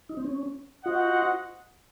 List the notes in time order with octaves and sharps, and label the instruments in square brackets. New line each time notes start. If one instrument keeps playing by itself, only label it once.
[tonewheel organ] D#4
C4
C#4
[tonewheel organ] F4 [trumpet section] F#4 C5 D#5 F#5